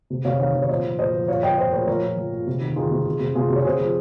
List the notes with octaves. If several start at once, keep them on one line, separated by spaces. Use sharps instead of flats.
C3
C3 C#5 F5
D#3 C#5 F5
D#3
C#5
A#2 C5 D#5
F3
A#2 C5 D#5
F3
A#2 C#5 F5
F3 D#5 G5
A#2 C5 D#5
A#2 A#4 C#5
F3 A#4 C#5
A#2
F3
A#2
C3
D#3
D#3 F4 G#4
C3
C3
C3
C3 F4 G#4
C3
C#5
C3 G#4 C5
F3